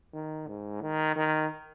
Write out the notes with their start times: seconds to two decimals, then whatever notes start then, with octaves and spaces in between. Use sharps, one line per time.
0.13 D#3
0.48 G#2
0.82 D#3
1.16 D#3